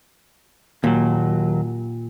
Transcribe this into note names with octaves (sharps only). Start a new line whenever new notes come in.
D#2 A#2 F#3